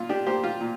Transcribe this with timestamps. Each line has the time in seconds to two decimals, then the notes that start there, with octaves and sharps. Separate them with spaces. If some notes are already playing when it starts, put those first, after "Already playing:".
Already playing: A#2 F4
0.09 D4 G4
0.26 A#3 G4 C5
0.44 F4
0.61 A#2